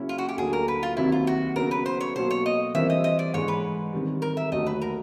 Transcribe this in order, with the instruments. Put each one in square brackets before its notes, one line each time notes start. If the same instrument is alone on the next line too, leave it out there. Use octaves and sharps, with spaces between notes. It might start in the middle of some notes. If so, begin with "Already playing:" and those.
Already playing: [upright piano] C#3 F#3 A#3 C#4 E4
[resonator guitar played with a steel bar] F4
F#4
G4
[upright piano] D2 D3 F#3 A#3 [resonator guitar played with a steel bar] G#4
[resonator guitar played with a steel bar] A#4
B4
F4
[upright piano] C2 C3 D#3 F#3 A#3 [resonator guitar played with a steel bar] E4
[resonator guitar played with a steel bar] F4
F#4
[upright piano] C#3 F#3 B3 [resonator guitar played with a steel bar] A#4
[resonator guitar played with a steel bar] B4
C5
C#5
[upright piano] B2 F#3 A#3 [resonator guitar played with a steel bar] C5
[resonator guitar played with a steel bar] C#5
D#5
[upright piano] E3 G3 C4 F4 A#4 [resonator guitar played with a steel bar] E5
[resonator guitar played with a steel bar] D#5
D#5
D5
[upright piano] G#2 E3 G#3 [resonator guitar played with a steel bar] C#5
[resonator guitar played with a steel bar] B4
[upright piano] C3 D#3 G3
[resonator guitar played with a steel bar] A#4
E5
[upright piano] D#2 D3 F#3 A3 [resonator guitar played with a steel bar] D#5
[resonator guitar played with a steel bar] B4
A#4